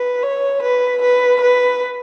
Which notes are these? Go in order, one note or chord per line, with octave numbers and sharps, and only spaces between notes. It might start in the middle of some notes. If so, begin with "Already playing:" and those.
Already playing: B4
C#5
B4
B4
B4